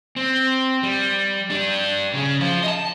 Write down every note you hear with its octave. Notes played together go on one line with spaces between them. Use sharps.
C4
G3
G3 D4
C#3 C#4
F3 F4
D#5 A5